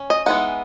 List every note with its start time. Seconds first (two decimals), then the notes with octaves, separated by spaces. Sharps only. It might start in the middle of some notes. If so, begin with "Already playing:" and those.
Already playing: C#4
0.10 D#5
0.26 E3 G#3 B3 D#4 F#5